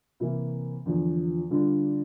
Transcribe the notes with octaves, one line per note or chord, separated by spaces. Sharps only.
C3 E3 A#3 E4
E2 D3 F3
D3 G3 D4 F4